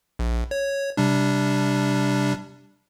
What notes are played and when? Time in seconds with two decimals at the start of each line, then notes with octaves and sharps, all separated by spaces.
0.19 A#1
0.51 C#5
0.97 C3 G3 D4